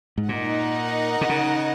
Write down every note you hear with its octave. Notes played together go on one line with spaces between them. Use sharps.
G#2
A#2 D#4 A#4 D#5 F#5
C3
C#3